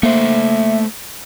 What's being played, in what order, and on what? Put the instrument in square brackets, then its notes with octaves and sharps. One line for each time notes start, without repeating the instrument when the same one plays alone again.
[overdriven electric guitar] A3 C5 [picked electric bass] A#3 [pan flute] E5